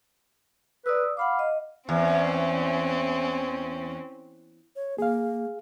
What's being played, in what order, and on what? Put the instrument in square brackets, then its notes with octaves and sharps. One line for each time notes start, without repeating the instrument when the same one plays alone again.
[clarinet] B4 [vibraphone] D5 D#6 E6
[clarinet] F5 [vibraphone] F#5 B5 D6
[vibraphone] D#5
[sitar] E2 [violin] C4 C#4
[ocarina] C#5
[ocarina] A#3 [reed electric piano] G#4 F5